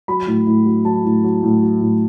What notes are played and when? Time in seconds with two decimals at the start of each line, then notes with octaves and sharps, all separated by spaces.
0.08 F#3 B5
0.27 A2
0.47 A2
0.66 F#3
0.85 F#3 A5
1.04 A2
1.24 F#3
1.43 A2
1.62 F#3
1.81 A2